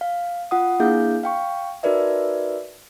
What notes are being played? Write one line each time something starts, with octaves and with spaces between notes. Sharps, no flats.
F5
F4 F#5 D#6
A#3 D4 E4 G#4 F5 G6
F5 G5 C#6
D#4 F#4 A#4 B4 D5 E5